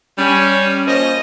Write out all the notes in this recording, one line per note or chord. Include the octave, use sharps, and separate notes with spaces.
G3 C#4
F3 A#3 C#4 C5 D#5